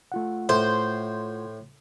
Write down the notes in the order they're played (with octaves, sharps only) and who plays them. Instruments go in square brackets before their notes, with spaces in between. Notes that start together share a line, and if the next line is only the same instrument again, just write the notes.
[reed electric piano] A3 F4 F#5
[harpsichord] A2 [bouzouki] C5